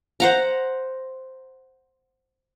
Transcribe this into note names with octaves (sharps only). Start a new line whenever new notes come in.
C5 F#5 A#5